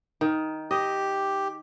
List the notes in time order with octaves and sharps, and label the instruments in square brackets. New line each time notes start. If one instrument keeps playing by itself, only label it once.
[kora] D#3
[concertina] G4 [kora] D#5